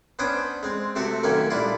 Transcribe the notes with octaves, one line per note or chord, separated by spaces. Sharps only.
B3 C#4 D4 C5 G5 D#6
G#3 C4
C3 A3 C4 F#4 A4
F#2 D#3 A3 A#3 C#4 A#4
A#2 G3 D4 E4 F4